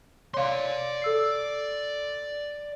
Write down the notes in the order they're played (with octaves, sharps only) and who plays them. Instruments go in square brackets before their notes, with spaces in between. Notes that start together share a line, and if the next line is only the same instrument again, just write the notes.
[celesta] C#5 F5 [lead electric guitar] D5 C6
[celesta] A4 E6 C7